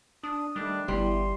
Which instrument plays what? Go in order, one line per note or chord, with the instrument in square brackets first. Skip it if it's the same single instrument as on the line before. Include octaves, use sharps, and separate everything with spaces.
[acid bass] D4 [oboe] D#6
[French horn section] D#3 A3 [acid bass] G3 [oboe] D4
[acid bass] G1 [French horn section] E3 B3 E4 [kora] G3 [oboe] C6